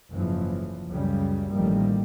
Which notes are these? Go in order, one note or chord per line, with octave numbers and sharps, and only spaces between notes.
F#1 G#2 C#3 E3 F3
C#2 F#2 C#3 G3
A1 A2 D#3 F3 G3 A#3